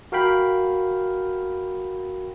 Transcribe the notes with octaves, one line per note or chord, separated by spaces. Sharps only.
F#4 A#4 F5 G5 B5